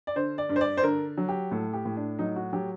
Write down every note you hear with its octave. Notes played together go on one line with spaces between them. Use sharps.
D5
D3 C5
D5
G2
C5
D5
C5
D3 A#4
F#3
G4
A2 A4
G4
A2
D4
F#3 D#4
F#4
F#3 G4